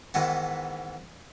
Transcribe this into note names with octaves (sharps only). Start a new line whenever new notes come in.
G#2 D#3 E3 B3